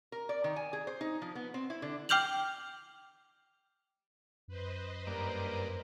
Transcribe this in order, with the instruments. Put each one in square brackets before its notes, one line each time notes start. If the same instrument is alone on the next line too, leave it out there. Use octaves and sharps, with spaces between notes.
[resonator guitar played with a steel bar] A#4
D5
D#3
G#5
G#4
C5
D#4
F3
B3
C4
E4
D3
[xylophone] G5 D6 F6 G6 F7 F#7
[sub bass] F#2 [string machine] B4 C5 D#5
[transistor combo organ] G2 A#3 D5 [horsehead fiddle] A#4